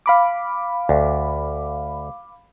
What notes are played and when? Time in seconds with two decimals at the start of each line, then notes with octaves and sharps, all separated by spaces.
0.06 F5 B5 D6
0.89 D2